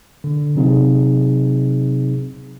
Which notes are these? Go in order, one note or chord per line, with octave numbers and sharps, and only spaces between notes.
D3
C3 F#3 C4 D#4 G#4